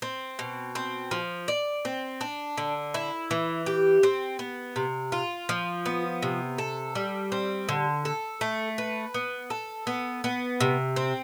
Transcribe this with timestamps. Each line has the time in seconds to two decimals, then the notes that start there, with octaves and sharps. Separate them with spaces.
0.02 C4
0.39 B2
0.75 C4
1.11 F3
1.48 D5
1.85 C4
2.21 D4
2.58 D3
2.94 E4
3.31 E3
3.66 G4
4.03 C4
4.39 B3
4.76 C3
5.12 F4
5.49 F3
5.86 B3
6.22 C3
6.58 A4
6.95 G3
7.32 C4
7.69 D3
8.05 A4
8.41 A3
8.78 B4
9.14 B3
9.50 A4
9.87 B3
10.24 B3
10.61 C3
10.96 C4